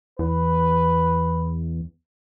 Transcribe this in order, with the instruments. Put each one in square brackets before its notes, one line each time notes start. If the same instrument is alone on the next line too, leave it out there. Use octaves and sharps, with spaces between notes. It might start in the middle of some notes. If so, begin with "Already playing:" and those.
[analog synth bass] E2 [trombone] B4